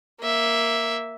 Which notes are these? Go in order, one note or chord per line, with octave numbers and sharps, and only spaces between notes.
A#3 E5